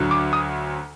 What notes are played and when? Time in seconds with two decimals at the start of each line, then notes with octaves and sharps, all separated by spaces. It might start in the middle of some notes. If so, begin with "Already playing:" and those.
Already playing: D2 D3 F#3
0.11 D6
0.33 D#6